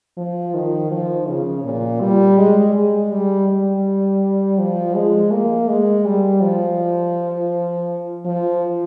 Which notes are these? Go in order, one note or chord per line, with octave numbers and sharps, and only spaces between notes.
F3
D#3
F3
C#3
A#2
G3
G#3
G#3
G3
G3
F3
G#3
A#3
G#3
G3
F3
F3